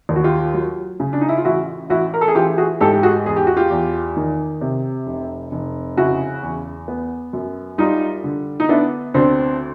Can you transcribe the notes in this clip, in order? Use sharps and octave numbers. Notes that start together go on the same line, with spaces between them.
D#2
F#4
F4 G4
F#3
C#3
D4
D#4
E4
F4
A1 E4 F#4
A1 E4 F#4
A#4
A4
G#4
E3 F4 G4
F#4 G#4
G#2 G4 A4
G4
F#4 G#4
E2 G#4
G4
F#4
F4 G4
E2
D#3
C3
F1
F1
C#3 E4 F#4
E2
B3
F#2
G3 D#4 F4
D3
D#4
B3 D4 E4
D2 C4 D4